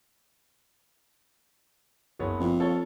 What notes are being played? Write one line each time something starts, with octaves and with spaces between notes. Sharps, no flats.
F#1 B3 C#5
F2
F4 A4 C#5